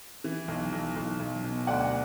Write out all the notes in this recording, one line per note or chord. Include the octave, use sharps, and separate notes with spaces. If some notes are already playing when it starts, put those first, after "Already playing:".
E3
B1
B1
B1
B1
B2
D2 D5 F#5